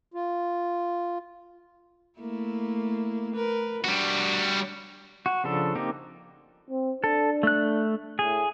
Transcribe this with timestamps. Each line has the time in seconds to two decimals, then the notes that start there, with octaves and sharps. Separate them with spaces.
0.14 F4
2.19 A3 A#3 E4
3.35 A#4 B4
3.84 G3 D4 F#4
5.26 F#4
5.44 C#3 F3 D4 A4
5.75 A#3 C4 D#4 G4
6.70 C4
7.04 D4 A4
7.43 A3 F#6
8.19 A2 G#4